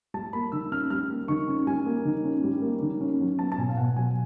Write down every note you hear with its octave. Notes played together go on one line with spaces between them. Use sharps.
G3 A5
A#3 B5
D#3 E6
C#4 F6
G3 F6
A#3
D#3 C#6
C#4
G3 G#5
A#3
D#3
C#4
G3
A#3
D#3
C#4
F#3
B3 A5
A5
B2 G#5
F5
B2 F#5
F#3 G#5